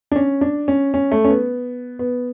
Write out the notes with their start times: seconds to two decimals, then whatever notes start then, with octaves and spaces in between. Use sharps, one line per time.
0.12 D4
0.16 C#4
0.41 D4
0.68 C#4
0.94 C#4
1.12 A3
1.25 C#4
1.30 B3
1.99 B3